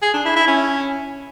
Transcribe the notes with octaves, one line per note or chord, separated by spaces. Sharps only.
G#4
D4
E4
E4
C#4